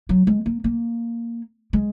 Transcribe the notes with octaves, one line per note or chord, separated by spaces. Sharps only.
F#3
G#3
A#3
A#3
G#3